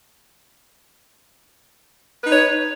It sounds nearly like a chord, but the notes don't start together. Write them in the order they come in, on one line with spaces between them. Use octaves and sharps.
B4 D#4 C#5